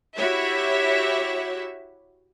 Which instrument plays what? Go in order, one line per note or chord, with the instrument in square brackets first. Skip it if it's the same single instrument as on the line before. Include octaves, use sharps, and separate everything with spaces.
[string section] E4 F#4 G4 C#5 E5